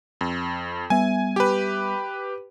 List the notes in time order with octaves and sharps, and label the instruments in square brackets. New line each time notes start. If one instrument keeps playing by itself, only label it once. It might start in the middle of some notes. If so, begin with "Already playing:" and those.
[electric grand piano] F2
[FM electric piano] G3 B3 E5 [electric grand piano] G#5
[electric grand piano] G4 B4